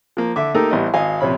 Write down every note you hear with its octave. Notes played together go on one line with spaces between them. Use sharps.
F3 A#3
D3 E5 D6
A3 A#3 D#4 G4 A4 A#4
A1 G3 B3 D#5
G#1 D#5 F5 G#5
A#1 C3 C#4 B5